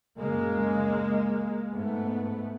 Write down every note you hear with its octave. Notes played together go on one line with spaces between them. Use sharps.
F#2 C#3 G#3 A#3
G#2 A3 B3